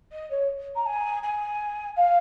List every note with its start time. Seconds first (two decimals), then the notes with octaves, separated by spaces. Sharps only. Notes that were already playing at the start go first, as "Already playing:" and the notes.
0.12 D#5
0.30 C#5
0.76 A#5
0.86 G#5
1.23 G#5
1.96 F5